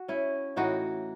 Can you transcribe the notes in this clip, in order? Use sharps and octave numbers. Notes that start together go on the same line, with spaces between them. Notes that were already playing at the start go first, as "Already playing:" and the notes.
Already playing: F#4
C#4 E4
A2 E3 D#4 F#4